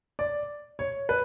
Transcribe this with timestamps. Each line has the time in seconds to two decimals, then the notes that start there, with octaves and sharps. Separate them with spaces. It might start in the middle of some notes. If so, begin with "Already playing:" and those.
0.19 D5
0.79 C#5
1.09 B4